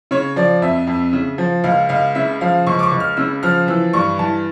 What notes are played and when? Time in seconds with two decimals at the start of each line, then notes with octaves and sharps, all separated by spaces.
0.11 C#3 C#5
0.36 F3 D5
0.62 F2 E5
0.87 F2
1.13 C#3
1.38 F3
1.64 C#2 F5
1.89 C#2 F5
2.15 C#3 E5
2.41 F3 F5
2.66 C#2 C#6
2.79 D6
2.83 C#6
2.92 C#2
3.00 F6
3.17 C#3 E6
3.43 F3 F6
3.68 E3 E6
3.93 G2 C#6
4.19 E3 A5